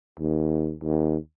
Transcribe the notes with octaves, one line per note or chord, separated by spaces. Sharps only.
D#2
D#2